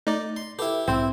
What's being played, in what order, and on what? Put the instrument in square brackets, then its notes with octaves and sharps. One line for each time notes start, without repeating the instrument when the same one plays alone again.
[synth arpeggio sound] A3 [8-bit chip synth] D#4 D5
[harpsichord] C6
[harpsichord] E4 G4 [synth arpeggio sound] A4 B4
[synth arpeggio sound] B1 G#2 [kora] C4 [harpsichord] E4